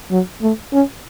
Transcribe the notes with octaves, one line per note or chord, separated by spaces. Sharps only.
F#3
A3
C#4